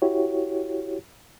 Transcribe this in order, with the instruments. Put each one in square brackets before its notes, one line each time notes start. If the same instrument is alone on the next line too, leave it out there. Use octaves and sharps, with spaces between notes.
[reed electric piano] E4 F#4 G4 C#5